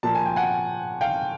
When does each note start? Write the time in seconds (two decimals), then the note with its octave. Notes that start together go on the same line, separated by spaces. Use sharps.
0.03 A#2 F3 A#3 A5
0.15 G#5
0.26 G5
0.36 F#5 G#5
1.01 F5 G5